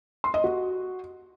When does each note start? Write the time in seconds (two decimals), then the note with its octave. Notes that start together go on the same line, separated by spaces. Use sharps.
0.24 C6
0.34 D#5
0.44 F#4